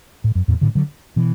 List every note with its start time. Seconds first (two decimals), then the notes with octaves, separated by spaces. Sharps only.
0.24 A2
0.35 F#2
0.48 E2 A2
0.61 A2 D3
0.75 D3 F#3
1.16 B2 E3